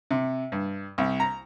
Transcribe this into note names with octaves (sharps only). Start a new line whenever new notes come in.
C3
G2
C2
A#5